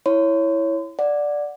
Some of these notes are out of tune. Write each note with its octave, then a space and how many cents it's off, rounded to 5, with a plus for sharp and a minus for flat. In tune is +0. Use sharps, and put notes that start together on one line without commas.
E4 +0 C#5 +0 C6 -40
D5 +0 F#5 -15